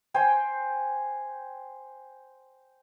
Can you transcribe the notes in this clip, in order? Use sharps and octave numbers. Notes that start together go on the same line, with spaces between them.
C5 G5 G#5